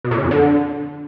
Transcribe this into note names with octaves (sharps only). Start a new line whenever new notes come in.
B2
A#2
C#3
F2
D3